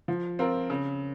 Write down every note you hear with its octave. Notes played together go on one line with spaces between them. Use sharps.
F3
C4 F4 A#4
C#3